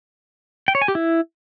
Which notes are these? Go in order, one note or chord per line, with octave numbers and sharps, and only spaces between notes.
G5
C#5
G#5
G4
E4